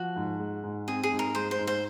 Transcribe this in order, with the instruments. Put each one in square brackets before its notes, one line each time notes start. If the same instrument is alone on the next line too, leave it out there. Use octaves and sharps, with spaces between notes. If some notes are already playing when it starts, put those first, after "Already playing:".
Already playing: [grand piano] F3 [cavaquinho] F#4
[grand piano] G#2
G#3
G#2
[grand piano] C4 [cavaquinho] G#4
[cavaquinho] G#4
[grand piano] G#2
[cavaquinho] A#4
[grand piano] G#3 [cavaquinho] C5
[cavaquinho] C5
[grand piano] G#2
[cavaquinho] C5